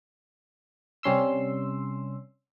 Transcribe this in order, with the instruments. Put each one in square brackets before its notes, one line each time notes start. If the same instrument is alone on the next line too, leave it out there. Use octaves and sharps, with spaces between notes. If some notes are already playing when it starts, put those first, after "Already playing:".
[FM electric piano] C3 G3 C#4 C6 E6